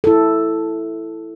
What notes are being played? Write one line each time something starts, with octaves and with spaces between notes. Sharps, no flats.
E4 A4